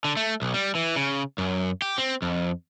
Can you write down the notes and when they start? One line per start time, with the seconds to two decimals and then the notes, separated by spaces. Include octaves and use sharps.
0.04 D3
0.17 A3
0.42 B1
0.54 G3
0.75 E3
0.96 C#3
1.38 F#2
1.82 G4
1.98 C4
2.22 F2